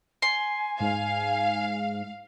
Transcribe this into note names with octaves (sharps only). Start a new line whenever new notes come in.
G#5 C6
G#2 F5